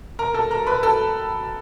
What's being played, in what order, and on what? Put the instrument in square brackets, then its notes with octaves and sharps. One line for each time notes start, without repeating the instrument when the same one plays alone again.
[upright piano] A#4 A#5
A4 A5
A#4 A#5
B4 B5
A4 A5